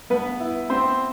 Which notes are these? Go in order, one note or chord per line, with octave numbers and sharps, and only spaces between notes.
G2 B3 B4
E4
B3 C4 C5